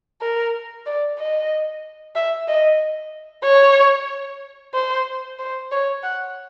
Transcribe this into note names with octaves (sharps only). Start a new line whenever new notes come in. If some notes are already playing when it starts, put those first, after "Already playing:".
A#4
D5
D#5
E5
D#5
C#5
C5
C5
C#5
F#5